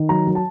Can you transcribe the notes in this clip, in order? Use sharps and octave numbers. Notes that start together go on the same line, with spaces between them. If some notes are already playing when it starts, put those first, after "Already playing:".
Already playing: D#3
F#3 A#5
F#3
A5